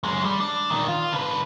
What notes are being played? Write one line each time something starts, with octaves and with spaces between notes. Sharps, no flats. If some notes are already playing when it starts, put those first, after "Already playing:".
F#2 G#3
G3
D4
A#2 D#3
F4
D3 B4